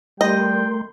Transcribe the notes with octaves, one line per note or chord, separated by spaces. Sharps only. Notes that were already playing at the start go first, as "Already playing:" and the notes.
G3 A3 A#4 D#5 G5 C6